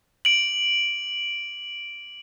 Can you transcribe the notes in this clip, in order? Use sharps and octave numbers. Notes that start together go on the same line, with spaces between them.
D7 F#7